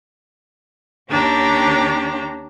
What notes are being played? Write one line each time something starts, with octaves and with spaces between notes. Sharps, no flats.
D#2 C#4 D4 G4 A#5